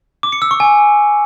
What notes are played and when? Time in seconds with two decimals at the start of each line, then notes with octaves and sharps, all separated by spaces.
0.23 D6
0.32 C#7
0.42 E6
0.51 C#6
0.60 G#5